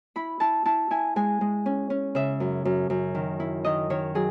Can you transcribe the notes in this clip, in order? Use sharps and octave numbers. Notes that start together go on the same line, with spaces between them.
E4 B5
E4 A5
E4 A5
E4 G#5
G#3 G#5
G#3
C#4
C#4
C#3 E5
F#2
F#2
F#2
D#3
E4
D#3 D#5
D#3 C#5
F#3 G#4